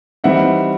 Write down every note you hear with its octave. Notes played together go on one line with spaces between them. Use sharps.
E3 G3 C4 D#4 E5 F#5